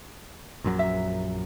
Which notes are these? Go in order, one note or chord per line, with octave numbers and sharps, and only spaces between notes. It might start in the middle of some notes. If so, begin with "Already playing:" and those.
A#1 F#2 F#3
E5